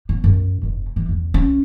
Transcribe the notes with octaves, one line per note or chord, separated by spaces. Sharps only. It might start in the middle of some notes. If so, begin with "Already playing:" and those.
B3
F#2
F1
E3
E2
C#4